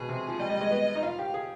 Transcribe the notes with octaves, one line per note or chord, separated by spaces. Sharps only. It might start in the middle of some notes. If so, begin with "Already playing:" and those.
Already playing: B2 G#4
C3
F3
G3 D#5
G3
G#3
B3
D#4
F4 F5
G4
G#4